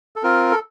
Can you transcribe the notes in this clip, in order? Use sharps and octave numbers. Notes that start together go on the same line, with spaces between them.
A4
C4 F4 A#4
A4